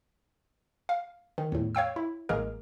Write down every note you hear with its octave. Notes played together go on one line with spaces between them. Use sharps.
F5
D#3
E2 A2
C#5 F5 G5 E6
E4
A1 G#3 A#3 G#4 A#4